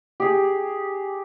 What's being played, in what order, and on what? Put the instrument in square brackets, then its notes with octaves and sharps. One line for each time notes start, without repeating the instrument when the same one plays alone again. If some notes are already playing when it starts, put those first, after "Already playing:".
[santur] G4 G#4 G5